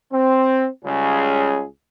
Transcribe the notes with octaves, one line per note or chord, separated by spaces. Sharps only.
C4
C#2 C#3 G3 C#4 G#4